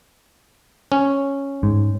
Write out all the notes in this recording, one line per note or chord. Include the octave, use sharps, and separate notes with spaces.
C#4
G#2